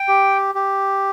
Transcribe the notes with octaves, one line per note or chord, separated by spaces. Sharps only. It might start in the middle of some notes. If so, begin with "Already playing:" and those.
Already playing: G5
G4
G4